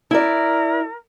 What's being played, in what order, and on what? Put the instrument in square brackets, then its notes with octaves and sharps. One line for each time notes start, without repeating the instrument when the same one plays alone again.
[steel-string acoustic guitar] E4 D5 [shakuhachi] A#4